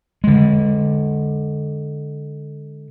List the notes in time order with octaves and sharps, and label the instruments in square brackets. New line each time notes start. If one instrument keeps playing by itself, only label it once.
[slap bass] D3 G#3